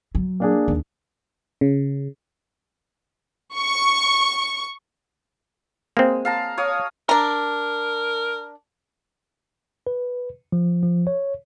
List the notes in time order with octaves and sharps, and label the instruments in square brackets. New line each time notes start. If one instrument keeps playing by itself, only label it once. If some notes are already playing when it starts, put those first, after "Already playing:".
[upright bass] F#3
[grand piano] A#3 D4 G#4
[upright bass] D#2
[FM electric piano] C#3
[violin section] C#6
[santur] G#3 [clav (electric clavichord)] A#3 C4
[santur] F5 A5 A#5
C#5 F5 D#6
[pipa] D4 A#5 [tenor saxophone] A#4
[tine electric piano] B4
F3
F3
C#5